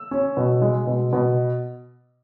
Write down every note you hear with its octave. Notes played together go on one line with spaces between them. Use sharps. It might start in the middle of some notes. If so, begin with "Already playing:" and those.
Already playing: E6
C#4
B2
G#3
B2
B2